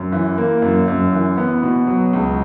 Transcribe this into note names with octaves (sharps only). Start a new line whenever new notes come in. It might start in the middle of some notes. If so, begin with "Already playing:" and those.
Already playing: F#2
E3
A#3
F#2
F#2
E3
B3
B2
F#3
C#2